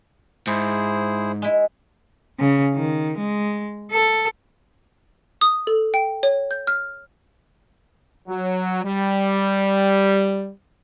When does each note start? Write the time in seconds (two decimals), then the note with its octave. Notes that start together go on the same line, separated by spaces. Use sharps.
0.47 G#2 E4 G#4 C5
1.42 G#3 E4
2.40 C#3
2.74 D#3
3.18 G#3
3.92 A4
5.41 D#6
5.67 A4
5.94 G5
6.23 C#5
6.51 G6
6.67 F6
8.27 F#3
8.84 G3